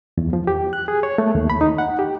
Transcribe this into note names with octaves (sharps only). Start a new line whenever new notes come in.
E2
F3
G4
F#6
G#4
C#5
A3
D#2
B5
D#4
F#5
G4